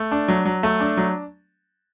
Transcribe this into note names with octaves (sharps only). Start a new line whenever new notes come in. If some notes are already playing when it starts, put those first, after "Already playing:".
Already playing: A3
D4
F#3
F#3
A3
D4
F#3